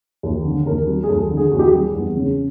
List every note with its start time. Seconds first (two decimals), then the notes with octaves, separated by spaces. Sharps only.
0.23 D#2
0.45 D3
0.66 D#2 A#4
0.87 G3
1.03 G#4
1.09 D#2 A4
1.31 D3
1.37 G#4
1.51 D#2 F#4
1.59 G4
1.66 G#4
1.73 G3
1.95 E2
2.16 C#3